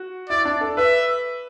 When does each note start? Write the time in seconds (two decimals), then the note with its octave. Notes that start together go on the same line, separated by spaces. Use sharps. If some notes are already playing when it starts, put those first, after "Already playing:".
Already playing: F#4
0.29 E4 D5
0.45 D4
0.61 A4
0.77 B4 E5